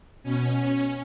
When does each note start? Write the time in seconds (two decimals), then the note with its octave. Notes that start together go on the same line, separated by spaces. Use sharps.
0.23 B2 C#4